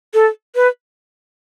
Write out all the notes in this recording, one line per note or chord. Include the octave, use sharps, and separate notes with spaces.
A4
B4